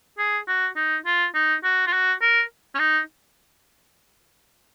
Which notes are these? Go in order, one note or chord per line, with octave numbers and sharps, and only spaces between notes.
G#4
F#4
D#4
F4
D#4
F#4
F4
F#4
A#4
C#4
D#4